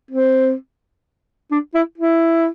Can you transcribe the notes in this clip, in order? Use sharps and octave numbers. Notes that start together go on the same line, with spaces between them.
C4
D4
E4
E4